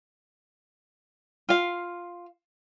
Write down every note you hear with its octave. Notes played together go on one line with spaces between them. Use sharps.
F4 F5